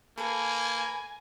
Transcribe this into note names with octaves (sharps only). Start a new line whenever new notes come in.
A#3 A4 B4 G#5